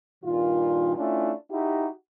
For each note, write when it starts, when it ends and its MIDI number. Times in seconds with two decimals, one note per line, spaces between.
0.24 0.94 43
0.24 0.94 46
0.24 0.94 51
0.24 0.94 65
0.97 1.32 57
0.97 1.32 61
0.97 1.32 62
0.97 1.32 64
0.97 1.32 65
1.51 1.88 63
1.51 1.88 64
1.51 1.88 66
1.51 1.88 67